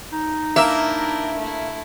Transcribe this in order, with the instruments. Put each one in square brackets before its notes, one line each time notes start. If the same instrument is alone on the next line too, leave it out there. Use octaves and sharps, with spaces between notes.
[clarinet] D#4
[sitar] A#3 E5 [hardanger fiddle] D4 E4
[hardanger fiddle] A3 E4